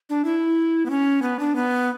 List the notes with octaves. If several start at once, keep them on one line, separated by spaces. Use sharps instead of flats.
D4
E4
B3
C#4
B3
D4
B3